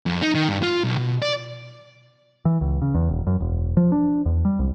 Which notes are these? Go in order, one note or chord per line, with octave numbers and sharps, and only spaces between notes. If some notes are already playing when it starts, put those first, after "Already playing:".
F2
D#4
D#3
G2
F4
B1
B2
D5
E3
C#2
C#3
E2
D#1
F#2
E1
F3
D4
E2
G3
C2